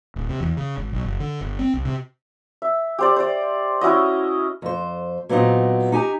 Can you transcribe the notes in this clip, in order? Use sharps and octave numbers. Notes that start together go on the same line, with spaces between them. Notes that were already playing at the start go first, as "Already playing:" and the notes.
D1
C3
E2
C#3
G#1
B1
F#1
D3
G1
C4
C2
C3
E5
G4 C5 D5
C5 D5
C#4 E4 F#4 D#5
F2 C5
A#2 F#3 B3 C4 D#4
D#4 G4 G#5 A#5